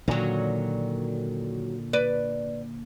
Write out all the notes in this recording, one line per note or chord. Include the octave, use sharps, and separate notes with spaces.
A#2 D3 D#3 F#3
B4 D5